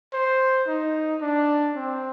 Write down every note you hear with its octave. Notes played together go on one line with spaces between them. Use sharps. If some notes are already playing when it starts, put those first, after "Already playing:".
C5
D#4
D4
C4